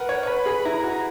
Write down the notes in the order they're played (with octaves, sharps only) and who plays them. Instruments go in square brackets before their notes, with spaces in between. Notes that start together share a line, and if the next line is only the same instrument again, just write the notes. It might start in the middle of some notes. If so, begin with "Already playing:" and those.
Already playing: [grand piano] A#4 B4 [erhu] F#5
[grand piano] C#5
C#5
[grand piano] B4 [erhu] B5
[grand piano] G#4
[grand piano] E4 [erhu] A#5
[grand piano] F#4